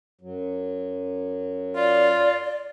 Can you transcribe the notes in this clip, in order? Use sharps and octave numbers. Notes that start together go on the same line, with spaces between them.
F#2 F#3
F4 D5